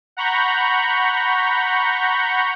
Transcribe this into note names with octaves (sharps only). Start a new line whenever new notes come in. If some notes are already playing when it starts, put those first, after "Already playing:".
F#5 A#5 B5 C#6 G6